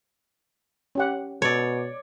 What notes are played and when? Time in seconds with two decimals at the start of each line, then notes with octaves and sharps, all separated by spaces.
0.95 C#4 G4 F#5
1.42 B2 A4 C#5 D5